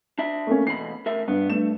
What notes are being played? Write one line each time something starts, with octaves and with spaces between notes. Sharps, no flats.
D4 E5
A3 A#3 C#4
E2 B2 B5 C7
A2 A#4 E5
G2 B3
G2 A3 E7